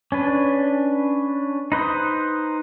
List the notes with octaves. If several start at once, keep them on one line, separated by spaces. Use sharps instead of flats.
C#4 D4 B4
D#4 B4 C5 D#6